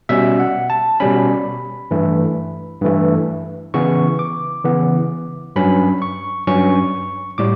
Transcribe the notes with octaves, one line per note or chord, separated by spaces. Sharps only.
B2 G3 C#4 E5
F#5
A5
B2 G3 C#4 B5
G2 E3 A3
G2 E3 A3
C#3 E3 B3 C#6
D6
C#3 E3 B3
G2 F#3 C#4 B5
C#6
G2 F#3 C#4 C#6
A2 G3 D6